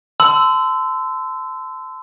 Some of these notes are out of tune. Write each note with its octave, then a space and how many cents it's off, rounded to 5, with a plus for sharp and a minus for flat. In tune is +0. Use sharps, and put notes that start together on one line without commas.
A5 +0 C6 -30 E6 +0